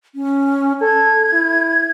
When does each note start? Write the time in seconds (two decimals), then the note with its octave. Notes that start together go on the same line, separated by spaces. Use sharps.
0.15 C#4
0.82 A4 G#6
1.33 E4